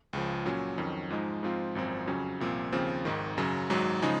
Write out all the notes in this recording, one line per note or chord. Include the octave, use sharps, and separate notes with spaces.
C#2 C#3 F3
A#2 F#3 C#4
F2 D#3 F#3 C#4
G#2 F3 G#3 D#4
G#2 F3 C4 F4
G#1 F#2 F3 C4
F2 C#3 F#3 C#4
C2 A#2 F3 C4
D#2 C#3 F3 C4
G#1 G#2 D#3
F#2 C#3 F#3
G#1 G#2 F#3
C#3 F3 G#3 D#4